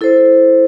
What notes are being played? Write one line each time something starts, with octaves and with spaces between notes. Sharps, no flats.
E4 A4 C5